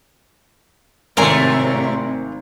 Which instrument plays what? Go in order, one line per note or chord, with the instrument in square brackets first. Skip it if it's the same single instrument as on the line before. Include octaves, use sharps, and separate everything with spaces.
[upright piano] G#1 [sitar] F#2 A3 [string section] A2 C3 [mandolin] C4 A#4 G#5